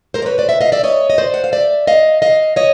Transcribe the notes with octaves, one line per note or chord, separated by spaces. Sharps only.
A#4 C5
D5
B4 C#5
C5 D5
E5 F#5
D#5 F5
D5 E5
C#5 D#5
D#5
C5 D5
F#5
F5
D5 E5
D#5 F5
D#5 F5
C#5 D#5